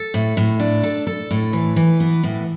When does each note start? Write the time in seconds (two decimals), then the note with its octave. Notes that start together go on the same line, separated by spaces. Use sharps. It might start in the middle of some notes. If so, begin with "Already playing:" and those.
Already playing: A4
0.14 A2
0.37 A2
0.60 D4
0.83 A4
1.07 A4
1.31 A2
1.53 E3
1.76 E3
2.00 B3
2.23 A2